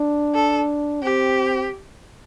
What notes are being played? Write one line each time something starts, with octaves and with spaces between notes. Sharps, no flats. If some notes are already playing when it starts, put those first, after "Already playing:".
Already playing: D4
A4
C4 G4